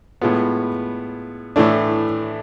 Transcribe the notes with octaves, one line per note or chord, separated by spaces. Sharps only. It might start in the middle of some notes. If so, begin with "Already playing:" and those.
A2 G#3 B3 F4
A2 E3 A3 D4